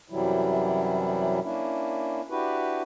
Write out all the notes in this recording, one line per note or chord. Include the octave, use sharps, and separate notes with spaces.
F#2 C3 E3 F#3 G3 E4
A#3 C#4 D4 E4
D4 E4 F#4 G4 B4